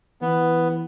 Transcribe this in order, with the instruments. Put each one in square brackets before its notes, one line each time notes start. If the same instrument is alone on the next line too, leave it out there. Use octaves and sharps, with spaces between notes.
[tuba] E3 [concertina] B3